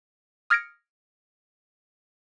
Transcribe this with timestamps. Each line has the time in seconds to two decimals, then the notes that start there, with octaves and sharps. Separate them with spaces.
0.50 D#6 F6 G#6 A#6 C#7 D7